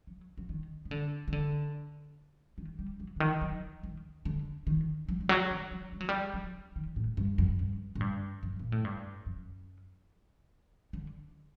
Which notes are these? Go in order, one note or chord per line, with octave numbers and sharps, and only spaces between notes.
F#3
F#3
D#3
D#3
D3
D#3
D3
D#3
G3
F#3
D3
D#3
F#3
D#3
D3
D#3
F#3
D#3
F#3
D#3
F#3
G3
F#3
G3
F#3
D#3
A2
G2
F#2
G2
A2
G2
F#2
A#2
A2
G2
F#2
D3